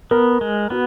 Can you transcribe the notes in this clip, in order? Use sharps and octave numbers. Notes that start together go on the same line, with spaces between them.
B3 A#4
G#3
B3 F#4